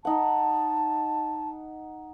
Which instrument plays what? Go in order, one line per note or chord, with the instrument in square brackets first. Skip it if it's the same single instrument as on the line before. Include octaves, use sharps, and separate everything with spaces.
[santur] D#4 F#5 [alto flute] A5